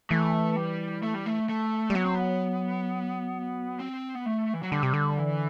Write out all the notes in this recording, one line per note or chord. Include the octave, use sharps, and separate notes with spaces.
E3 A3
G3
A3
G3
A3
A3
G3
F#3 B3
C4
B3
C4
B3
A3
E3
F#3
D3 G3
C3
D3
E3